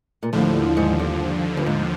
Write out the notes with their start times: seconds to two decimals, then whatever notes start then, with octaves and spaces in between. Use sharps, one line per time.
0.23 A#2
0.33 D#2 A2 D3 F3
0.77 G#2
0.99 G2
1.57 G2
1.66 G#2